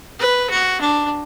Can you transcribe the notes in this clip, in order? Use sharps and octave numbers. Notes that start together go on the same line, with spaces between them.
B4
F#4
D4